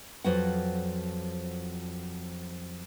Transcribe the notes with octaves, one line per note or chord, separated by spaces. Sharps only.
F2 F3 F#3 B4 F#5